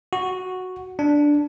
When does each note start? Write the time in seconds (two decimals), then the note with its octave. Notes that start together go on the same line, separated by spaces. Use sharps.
0.13 F#4
0.99 D4